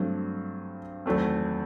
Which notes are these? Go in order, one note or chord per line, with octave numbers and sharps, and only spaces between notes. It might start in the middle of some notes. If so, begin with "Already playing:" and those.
Already playing: G2 F#3 A3 C4
E2 D#3 F#3 A3 C4